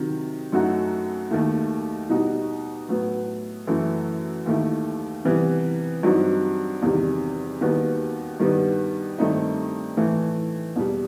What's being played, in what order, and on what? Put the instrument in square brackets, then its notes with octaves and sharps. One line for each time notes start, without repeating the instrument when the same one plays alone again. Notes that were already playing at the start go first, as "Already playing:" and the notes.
Already playing: [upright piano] C3 D#3 F#3
F#2 F#3 A3 D#4 F#4
D#2 D#3 A3
B2 G3 D#4 F#4
A2 F#3 B3
F#2 E3 A3 E4
D#2 D#3 A3 E4
C3 E3 G3 B3
G2 F#3 C4 D#4 F#4
E2 C3 D#3 G3
D#2 D#3 G3 B3 F#4
G2 D#3 G3 B3
G2 D#3 A3 C4 D#4
A2 E3 A3
E2 B2 G3